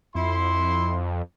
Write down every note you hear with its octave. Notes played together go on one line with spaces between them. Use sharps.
F2 E4 C6